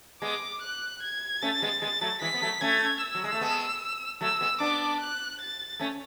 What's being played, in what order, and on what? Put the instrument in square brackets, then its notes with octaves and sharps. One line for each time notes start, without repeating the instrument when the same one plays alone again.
[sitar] G#3 B3 [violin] D6
[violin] F#6
G#6
[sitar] A3 C#4 [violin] A6
[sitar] G#3 B3
[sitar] G#3 B3 [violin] A6
[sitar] F#3 A3
[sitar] E3 G#3 [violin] B6
[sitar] B3
F#3 A3
[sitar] A3 C#4 [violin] G#6
[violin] E6
[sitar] F#3
G#3
A3
G#3 B3
[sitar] F#3 A3 [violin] E6
[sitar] G#3 B3
[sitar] B3 D4 [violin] D6
[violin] F#6
A6
[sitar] A3 C#4